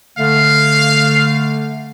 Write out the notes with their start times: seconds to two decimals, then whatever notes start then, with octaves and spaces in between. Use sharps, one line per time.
0.18 D3 A3 F5